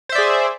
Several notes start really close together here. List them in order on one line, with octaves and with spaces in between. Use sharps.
C5 E5 D5 G#4